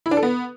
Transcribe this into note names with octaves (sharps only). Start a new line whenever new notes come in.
E4
D4
A4
B3